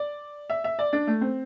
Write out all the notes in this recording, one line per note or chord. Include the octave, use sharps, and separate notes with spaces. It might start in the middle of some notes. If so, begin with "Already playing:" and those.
Already playing: D5
E5
E5
D5
D4
A3
C4